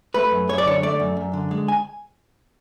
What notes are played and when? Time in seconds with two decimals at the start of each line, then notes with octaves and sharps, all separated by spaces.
0.14 A3 B4
0.31 F#2
0.49 F#2 C#5
0.58 D5
0.66 D3 C#5
0.83 A3 D5
1.00 F#2
1.17 F#2
1.33 D3
1.51 G#3
1.68 G#5